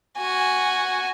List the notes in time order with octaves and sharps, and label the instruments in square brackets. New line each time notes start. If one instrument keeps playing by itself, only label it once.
[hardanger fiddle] F#4 G#5